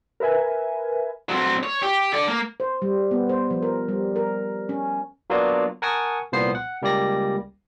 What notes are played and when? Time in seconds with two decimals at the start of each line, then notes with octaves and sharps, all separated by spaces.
0.20 A#4 B4 E5 G#5
1.29 F#3 C4
1.63 C#5
1.83 G4
2.13 A4 D5
2.28 A#3
2.60 C5
2.82 G3
3.11 B3
3.29 C5
3.50 F3
3.62 A#4
3.88 G3
4.16 A#4
4.69 C#4
5.30 F#3 A#3 B3 D4 F4 F#4
5.82 A#4 F#5 G#5 A5 C#6 D#6
6.32 C2 A#2 F3 B3 C5 C7
6.55 F#5
6.82 C#2 G3 A#3 G4 D5 A#6